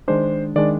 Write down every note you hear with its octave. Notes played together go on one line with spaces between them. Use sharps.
D#3 G#3 D4 C5
D#3 G#3 D4 D5